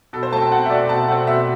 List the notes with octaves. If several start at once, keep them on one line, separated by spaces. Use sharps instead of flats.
B2 A4
C5
A3 C4 A5
G5
B2 F#5
E5
A3 C4 D5
B2 A5
A3 C4 F#5
B2 E5